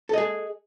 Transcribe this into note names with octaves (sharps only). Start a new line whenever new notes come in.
G#4 A4 D#5